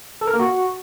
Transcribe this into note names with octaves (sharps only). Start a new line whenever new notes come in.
A4
A#4
A#3
F#4